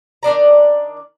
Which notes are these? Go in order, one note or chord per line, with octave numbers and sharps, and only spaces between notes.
D#3 D4 D5 A#5